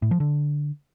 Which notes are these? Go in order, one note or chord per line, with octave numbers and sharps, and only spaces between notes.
A2
F3
D3